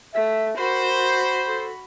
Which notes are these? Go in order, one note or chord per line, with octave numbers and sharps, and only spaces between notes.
A3 E5
F#4 A#4 C5 B5
A4